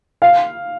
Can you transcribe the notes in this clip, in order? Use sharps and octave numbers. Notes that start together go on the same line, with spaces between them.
F5